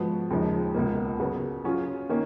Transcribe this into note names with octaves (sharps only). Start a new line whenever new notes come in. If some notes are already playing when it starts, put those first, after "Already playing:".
Already playing: G#2 F3 B3 F#4
D#2 C#3 F3 G#3 D#4
C#2 B2 A#3
C#3 F#3 B3
F#3 C#4 F4 G#4
D#3 A#3 C#4